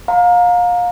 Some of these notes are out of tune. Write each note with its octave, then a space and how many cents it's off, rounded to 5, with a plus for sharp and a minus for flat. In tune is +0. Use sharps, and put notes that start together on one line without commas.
F5 +30 A#5 +0